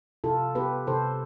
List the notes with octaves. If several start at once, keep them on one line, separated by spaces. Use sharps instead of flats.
C3 F4 A4
B3 G4 B4
C3 A4 C5